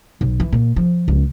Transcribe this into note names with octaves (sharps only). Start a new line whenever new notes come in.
B1
E3
A#2
F3
C#2